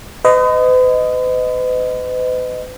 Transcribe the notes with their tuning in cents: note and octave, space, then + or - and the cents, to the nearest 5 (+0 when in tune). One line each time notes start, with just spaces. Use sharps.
B4 +45 D#5 +0